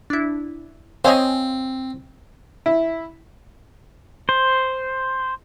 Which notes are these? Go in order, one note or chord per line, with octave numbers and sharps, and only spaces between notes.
D4 E4
C4 C5 C#5 D#5 F5 G#5
E4
C5